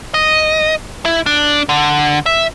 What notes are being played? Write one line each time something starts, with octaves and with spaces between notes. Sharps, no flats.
D#5
E4
D4
D3
E5